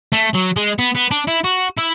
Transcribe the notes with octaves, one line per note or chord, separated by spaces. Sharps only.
A3
F#3
G#3
B3
B3
D4
E4
F#4
E4